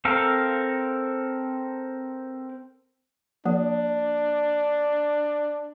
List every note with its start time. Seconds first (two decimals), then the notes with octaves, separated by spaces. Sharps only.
0.05 C4 A4 A#4 F5
3.45 F3 A#3 D4